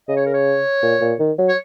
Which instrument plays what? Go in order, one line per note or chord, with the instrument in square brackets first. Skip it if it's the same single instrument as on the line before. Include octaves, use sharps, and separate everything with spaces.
[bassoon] C#3 [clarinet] D#5
[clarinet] C#5
A#4
C#5
[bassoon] A#2
A#2
D#3
F#3
[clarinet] C#5